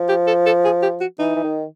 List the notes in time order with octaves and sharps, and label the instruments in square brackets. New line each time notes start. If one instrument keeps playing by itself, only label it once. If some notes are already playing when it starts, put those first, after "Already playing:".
Already playing: [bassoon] F3
[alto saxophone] G4
A4
A4
G#4
G4
F#4
[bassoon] E3 [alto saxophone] D#4
[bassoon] E3
D#3